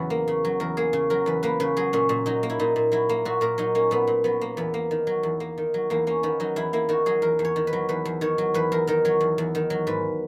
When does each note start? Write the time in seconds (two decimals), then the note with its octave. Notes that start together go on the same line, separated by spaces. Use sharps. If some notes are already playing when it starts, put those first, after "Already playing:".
Already playing: E2 C#3 F#3 B4
0.10 A#3
0.28 C#3
0.45 F#3
0.60 E2 A#4
0.77 A#3 G#4
0.93 C#3
1.10 F#3 A#4
1.26 E2 B4
1.43 A#3 B4
1.60 C#3 B4
1.77 F#3 G#4
1.93 A#2 C#4
2.09 A#2
2.26 F#3 D#4
2.43 A#3
2.50 E4
2.59 A#2 D#4
2.76 A#2
2.92 F#3 E4
3.09 A#3
3.25 A#2 F#4
3.41 A#2 A#4
3.58 F#3 D#4
3.75 A#3 C#4
3.91 A#2 B3
4.07 A#2
4.24 F#3 B3
4.41 A#3
4.57 E2 B3
4.74 A#3
4.91 D#3
5.07 F#3
5.23 E2
5.40 A#3
5.58 D#3
5.74 F#3
5.90 E2 A#3
6.07 A#3 C#4
6.23 D#3 B3
6.40 F#3 D#4
6.56 E2 E4
6.73 A#3 E4
6.89 D#3 F#4
7.06 F#3 G#4
7.22 E2 A#4
7.39 E2
7.45 C#5
7.56 D#3
7.67 B4
7.73 F#3
7.89 E2 B4
8.05 E2
8.21 D#3 C#5
8.38 F#3
8.54 E2 B4
8.72 E2 A#4
8.87 D#3 A#4
9.05 F#3 C#5
9.20 E2
9.38 E2
9.55 D#3
9.70 F#3
9.87 G#2 B4